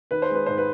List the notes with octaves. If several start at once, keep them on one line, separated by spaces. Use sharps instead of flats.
D#3 B4
C5
G#3
B4
G#2 C5
B4